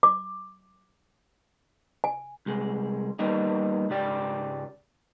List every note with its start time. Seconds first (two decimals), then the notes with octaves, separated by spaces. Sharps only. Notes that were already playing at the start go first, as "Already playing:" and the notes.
0.03 D6
2.04 G#5
2.46 C2 G#3
3.19 G3 A#3 B3 D#4
3.90 C#2 G#2 G4 D5